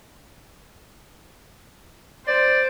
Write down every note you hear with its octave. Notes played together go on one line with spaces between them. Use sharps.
C5 D5